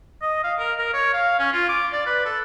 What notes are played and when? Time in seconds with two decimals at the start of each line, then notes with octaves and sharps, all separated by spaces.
0.22 D#5
0.43 F5
0.59 A#4
0.79 A#4
0.94 C#5
1.13 F5
1.39 C#4
1.53 F4
1.69 D6
1.92 D5
2.06 B4
2.25 A4